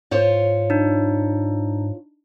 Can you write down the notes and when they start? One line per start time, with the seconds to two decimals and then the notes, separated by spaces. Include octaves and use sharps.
0.11 G#2 F4 C5 C#5
0.70 D4 D#4